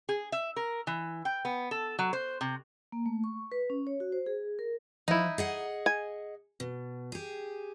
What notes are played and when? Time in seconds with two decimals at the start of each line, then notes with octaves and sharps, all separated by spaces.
0.09 G#4
0.32 E5
0.56 A#4
0.87 E3
1.25 G5
1.45 B3
1.71 A4
1.99 F#3
2.13 C5
2.41 C3
2.92 A#3
3.06 A3
3.24 C#6
3.52 B4
3.70 C#4
3.87 C#5
4.00 F#4
4.12 C5
4.26 G#4
4.59 A#4
5.08 F3 D#4 E4
5.38 G#4 D#5 F#5
5.86 G#5
6.60 B2
7.12 G4 G#4